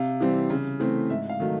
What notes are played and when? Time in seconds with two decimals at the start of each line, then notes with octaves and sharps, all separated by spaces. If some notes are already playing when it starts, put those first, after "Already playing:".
Already playing: C3 F5
0.20 E3 G3 C4
0.50 C#3
0.80 E3 A3 C4
1.10 G#2 E5
1.29 F5
1.40 D#3 F#3 A3